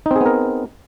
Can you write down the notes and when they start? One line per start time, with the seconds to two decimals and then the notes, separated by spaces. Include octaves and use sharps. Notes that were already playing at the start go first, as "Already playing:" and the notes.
0.06 D#4
0.11 C4
0.16 G#4
0.21 B3
0.26 A#4